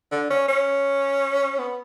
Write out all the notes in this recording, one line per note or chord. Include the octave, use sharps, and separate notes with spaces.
D3
C#4
C#4
B3